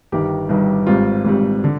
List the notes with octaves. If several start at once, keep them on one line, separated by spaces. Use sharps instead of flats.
G1 G2 D#3 G4
G1 G2 D#3
G#1 G#2 G3 C4 F4
G#1 G#2 G3 C4
D3